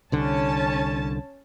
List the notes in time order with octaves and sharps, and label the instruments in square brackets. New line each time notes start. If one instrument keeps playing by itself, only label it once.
[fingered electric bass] C2 D3 [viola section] C#4 A5